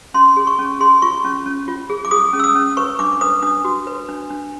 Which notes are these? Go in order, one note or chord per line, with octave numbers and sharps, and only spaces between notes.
C#4 C6
G#4
C#6
C#4
G#4 C6
F4 C#6
C#4
C#4
F4
G#4
D6
G#4 D#6
C#4
E6
D#6
C#4
B4 C#6
D4 D6
B4 D#6
D4 D#6
F#4
B4
D4
D4